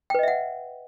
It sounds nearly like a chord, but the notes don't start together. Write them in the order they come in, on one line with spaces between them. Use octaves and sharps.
G5 B4 D#5 E5 F#5